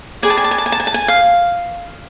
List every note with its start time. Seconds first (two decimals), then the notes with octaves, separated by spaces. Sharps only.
0.23 G#4 B4 D5 G#5
0.30 A5
0.37 G#5
0.44 A5
0.51 G#5
0.58 A5
0.66 G#5
0.72 A5
0.80 G#5
0.87 A5
0.94 G#5
1.08 F5